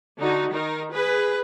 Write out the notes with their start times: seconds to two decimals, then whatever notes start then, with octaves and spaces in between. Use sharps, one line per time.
0.20 D3 D#4 F#4
0.52 D#3 D#4 A#4
0.91 G#4 B4